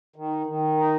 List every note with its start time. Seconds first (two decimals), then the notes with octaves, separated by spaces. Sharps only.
0.16 D#3
0.47 D#3
0.77 D#4